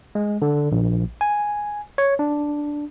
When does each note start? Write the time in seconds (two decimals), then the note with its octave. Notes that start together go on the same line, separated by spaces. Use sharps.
0.15 G#3
0.42 D3
0.72 A#1
1.21 G#5
1.98 C#5
2.19 D4